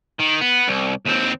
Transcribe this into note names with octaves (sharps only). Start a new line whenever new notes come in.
D#3
B3
C2
D#2 C4